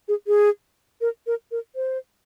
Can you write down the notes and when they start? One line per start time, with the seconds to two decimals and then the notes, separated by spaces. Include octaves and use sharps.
0.08 G#4
0.27 G#4
1.01 A#4
1.27 A#4
1.51 A#4
1.76 C5